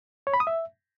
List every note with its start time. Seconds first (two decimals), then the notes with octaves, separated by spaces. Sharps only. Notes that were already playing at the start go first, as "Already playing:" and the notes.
0.27 C#5
0.34 B5
0.40 D#6
0.47 E5